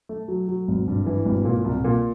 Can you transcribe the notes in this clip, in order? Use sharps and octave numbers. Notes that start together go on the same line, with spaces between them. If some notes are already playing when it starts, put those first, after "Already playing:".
A3
F#3
F#3
G#1
G2
E3
G#1
A#2
C2
A#2